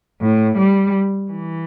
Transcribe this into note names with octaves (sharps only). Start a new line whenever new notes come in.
A2
G3
E3